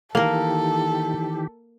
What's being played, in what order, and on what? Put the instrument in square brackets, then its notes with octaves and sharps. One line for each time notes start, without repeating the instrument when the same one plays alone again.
[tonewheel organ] D#3 E3 G4 [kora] A#3 A#4 [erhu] A4 [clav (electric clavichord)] F5